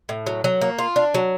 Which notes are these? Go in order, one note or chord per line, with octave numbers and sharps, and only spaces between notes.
A2
F#3
F#3
A#3
F4
D4
F#3